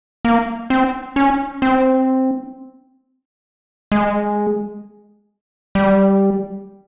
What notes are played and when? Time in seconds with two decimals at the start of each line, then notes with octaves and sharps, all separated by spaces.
0.25 A#3
0.70 C4
1.16 C#4
1.62 C4
3.92 G#3
5.75 G3